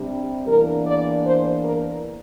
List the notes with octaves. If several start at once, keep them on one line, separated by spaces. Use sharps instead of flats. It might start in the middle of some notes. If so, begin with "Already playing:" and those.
Already playing: C3 G3 D4
E2 E3 A#3 D4 A#4
D5
C5
A#4